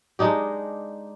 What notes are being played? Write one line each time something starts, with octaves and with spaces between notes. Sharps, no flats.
G#3 D4 D#4 G4